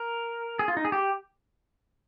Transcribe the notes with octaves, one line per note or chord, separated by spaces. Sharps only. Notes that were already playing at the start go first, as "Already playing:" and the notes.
Already playing: A#4
G#4
F4
D#4
G#4
G4